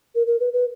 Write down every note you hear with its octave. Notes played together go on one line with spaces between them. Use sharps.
A#4
A#4
B4
B4